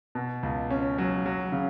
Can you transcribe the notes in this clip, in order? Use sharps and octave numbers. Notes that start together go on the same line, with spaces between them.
B2
C#2
C#4
F#3
F#3
C#3